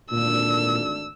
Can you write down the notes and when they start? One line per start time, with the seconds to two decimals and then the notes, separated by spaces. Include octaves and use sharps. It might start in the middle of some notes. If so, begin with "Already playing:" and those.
0.11 G#1 D2 A#2 D4 E6